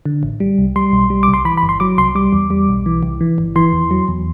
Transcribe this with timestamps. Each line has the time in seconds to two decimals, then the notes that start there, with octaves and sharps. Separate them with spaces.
0.05 D3
0.23 A1
0.40 G3
0.58 C2
0.76 G3 C6
0.93 B1
1.10 G3
1.23 D6
1.28 C2
1.34 C6
1.45 E3 B5
1.57 B5
1.63 G1
1.69 C6
1.80 F#3 D6
1.98 C2 C6
2.15 G3 D6
2.33 E2
2.50 G3
2.69 B1
2.86 E3
3.03 C2
3.21 E3
3.38 G1
3.56 E3 C6
3.73 E2
3.91 F#3
4.08 E2